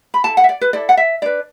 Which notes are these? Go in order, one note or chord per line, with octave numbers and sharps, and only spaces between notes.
B5
E4 A4 A5
F#5
E5
D5
B4
E4 A4 D5
F#5
E5
D4 B4 D5